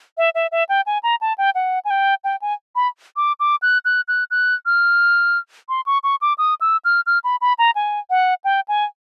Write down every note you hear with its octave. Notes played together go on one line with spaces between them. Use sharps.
E5
E5
E5
G5
G#5
A#5
A5
G5
F#5
G#5
G5
G5
G#5
B5
D6
D6
F#6
F#6
F#6
F#6
F6
C6
C#6
C#6
D6
D#6
E6
F6
F6
B5
B5
A#5
G#5
F#5
G5
G#5